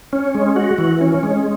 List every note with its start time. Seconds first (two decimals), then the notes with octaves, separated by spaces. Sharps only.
0.13 C#4
0.35 G#3
0.56 F#4
0.78 E3
1.01 C#4
1.23 G#3